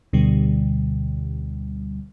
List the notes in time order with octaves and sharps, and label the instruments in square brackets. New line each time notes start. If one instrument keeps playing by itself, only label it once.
[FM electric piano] D2 B2 D3 G3